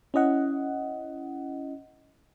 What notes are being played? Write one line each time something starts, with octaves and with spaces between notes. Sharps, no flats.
C#4 E4 D#5 F#5